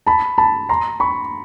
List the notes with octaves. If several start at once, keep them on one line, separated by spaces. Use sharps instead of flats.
A5 B5
A5 B5
A#5 C6
B5 C#6